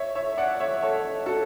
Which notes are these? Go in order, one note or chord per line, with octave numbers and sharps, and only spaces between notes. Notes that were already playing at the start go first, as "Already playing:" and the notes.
Already playing: C#5 E5
C#5 E5
D5 F#5
C#5 E5
A4 C#5
F#4 A4